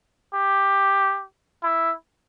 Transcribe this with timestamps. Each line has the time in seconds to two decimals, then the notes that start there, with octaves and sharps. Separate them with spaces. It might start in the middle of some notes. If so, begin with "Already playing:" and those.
0.34 G4
1.63 E4